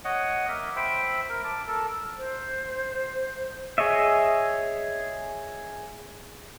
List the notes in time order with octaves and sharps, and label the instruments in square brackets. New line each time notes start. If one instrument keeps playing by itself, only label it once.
[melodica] C#5 D#5 F#5
A#3 A#4 E5
C5 E5 G5 B5
A#4
A5 D6
A4 A#4 A5
[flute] C5
[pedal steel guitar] G#4 C#5 D#5 E5